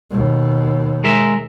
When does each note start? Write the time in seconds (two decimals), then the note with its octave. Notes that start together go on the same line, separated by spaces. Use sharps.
0.11 D#2 B2
1.04 G#3 A#4 E5